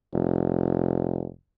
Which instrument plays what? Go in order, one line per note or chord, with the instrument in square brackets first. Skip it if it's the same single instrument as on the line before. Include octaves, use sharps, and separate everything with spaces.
[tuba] F1